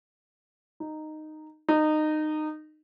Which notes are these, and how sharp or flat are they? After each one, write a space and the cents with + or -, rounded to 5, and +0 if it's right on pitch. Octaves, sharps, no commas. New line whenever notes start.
D#4 -10
D#4 -20